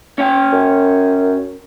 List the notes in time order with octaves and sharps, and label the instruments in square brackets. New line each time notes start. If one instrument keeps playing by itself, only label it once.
[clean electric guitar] C#4 C#5 G5
[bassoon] F#2